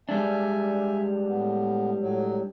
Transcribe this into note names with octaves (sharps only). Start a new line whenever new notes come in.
G3 G#3 D4 E5 G#5
A2 B3
A2 F#3